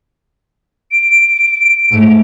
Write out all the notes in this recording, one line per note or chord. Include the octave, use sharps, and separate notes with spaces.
D7
G#2 A3